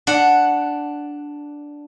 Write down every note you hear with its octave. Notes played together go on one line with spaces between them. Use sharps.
D4 F#5